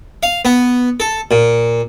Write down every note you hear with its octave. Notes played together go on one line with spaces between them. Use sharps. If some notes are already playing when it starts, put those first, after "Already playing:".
F5
B3
A4
A#2